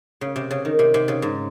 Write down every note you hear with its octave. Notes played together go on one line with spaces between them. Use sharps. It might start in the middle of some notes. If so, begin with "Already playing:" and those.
C#3
C3
C#3
D#3
C3
C3
C#3
G#2